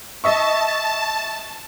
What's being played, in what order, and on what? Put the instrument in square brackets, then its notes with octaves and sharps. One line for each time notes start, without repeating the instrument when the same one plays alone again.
[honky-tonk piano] D#5 E5 C#6 [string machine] A5